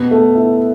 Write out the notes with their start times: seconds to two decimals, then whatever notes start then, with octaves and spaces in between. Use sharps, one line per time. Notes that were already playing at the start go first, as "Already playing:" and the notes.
Already playing: B2 B3
0.11 A3
0.35 E4